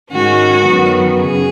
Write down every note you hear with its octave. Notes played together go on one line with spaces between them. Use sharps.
G#2 D#3 G#3 C#4 F#4
F#2 D#3 F#3 B3
F#2 C#3 G#4